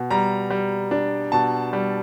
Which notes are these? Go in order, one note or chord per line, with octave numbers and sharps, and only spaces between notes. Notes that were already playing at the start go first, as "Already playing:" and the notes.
Already playing: B2
G3 A#5
G3
D4
B2 A5
G3